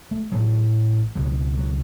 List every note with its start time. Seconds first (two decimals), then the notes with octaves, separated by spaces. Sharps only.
0.11 A3
0.32 A1 A2 F#3
1.15 C#2 B2 F#3
1.57 F#3